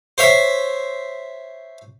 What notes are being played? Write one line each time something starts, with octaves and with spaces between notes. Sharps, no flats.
C5 C#5 E5